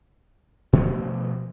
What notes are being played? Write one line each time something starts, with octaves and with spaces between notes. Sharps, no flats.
B2 F3 A3 B3